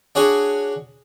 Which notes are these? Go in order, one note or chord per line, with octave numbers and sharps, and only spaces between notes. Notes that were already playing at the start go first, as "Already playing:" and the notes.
D4 F#4 G#4 C#5